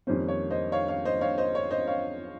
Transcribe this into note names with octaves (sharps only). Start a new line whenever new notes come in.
F2 D#3 G3 A#3 C#4 C5
C#5
C5 D#5
C#5 F5
C#5 F5
C5 D#5
C#5 F5
C5 D#5
C#5
C5 D#5
C#5 F5